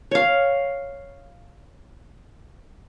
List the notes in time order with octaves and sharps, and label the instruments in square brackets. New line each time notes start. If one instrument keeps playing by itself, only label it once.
[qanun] C#5 F5